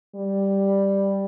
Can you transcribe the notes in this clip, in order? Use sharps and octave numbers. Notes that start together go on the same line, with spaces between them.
G3